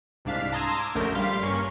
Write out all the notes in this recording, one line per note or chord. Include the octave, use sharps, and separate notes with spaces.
C2 G#2 D4 F5 B6
A5 A#5 C6 D#6 E6 G#6
D6
A#1 F#2 D3 A3 A#4 G6
A#1 G3 F5 C6 B6
G2 A#3 C#4 C#6